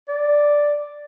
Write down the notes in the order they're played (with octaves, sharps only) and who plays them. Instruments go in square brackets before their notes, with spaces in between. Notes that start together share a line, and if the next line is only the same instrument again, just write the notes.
[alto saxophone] D5